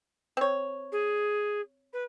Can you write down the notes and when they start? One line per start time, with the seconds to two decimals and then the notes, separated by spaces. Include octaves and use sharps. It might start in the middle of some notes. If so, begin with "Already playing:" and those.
0.37 C4 C#5
0.92 G#4
1.93 B4